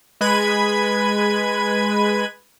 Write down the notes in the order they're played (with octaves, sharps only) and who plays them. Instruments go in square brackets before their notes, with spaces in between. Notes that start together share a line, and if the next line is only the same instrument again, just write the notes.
[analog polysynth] G#3 B4 B5 G#6 D#7